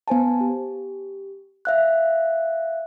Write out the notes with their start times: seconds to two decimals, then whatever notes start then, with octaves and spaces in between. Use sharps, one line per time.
0.08 B3 C5 G#5 A5
0.41 G4
1.65 E5 F5 F#6